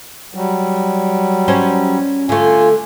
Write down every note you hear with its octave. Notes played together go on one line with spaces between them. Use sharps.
F#3 G3
C#4 C5
D3 A3 F4 G#5